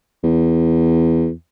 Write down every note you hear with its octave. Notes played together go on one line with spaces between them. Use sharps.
E2